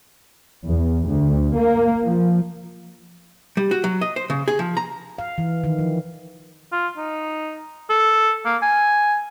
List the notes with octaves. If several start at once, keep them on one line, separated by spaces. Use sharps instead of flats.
E2
D2
A#3
F3
G3
F#4
F#3
D#5
C5
C#3
G#4
F3
A#5
F5
E3
D#3
F3
F4
D#4
A4
A#3
G#5